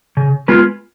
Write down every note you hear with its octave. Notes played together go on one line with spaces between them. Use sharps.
C#3
G#3 B3 F4 B4